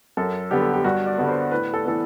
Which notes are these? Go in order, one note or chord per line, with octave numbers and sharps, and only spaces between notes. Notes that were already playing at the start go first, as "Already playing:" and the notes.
F#2 A4
D3 G3 B3 G4
A4
G4
G2 F#4
D5
D3 G3 B3
C5
A2 B4
A4
E3 B3 A4